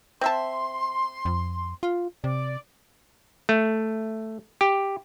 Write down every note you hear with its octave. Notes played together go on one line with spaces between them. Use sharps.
C4 E5 A5 C6
F2
F4
C3 D5
A3
G4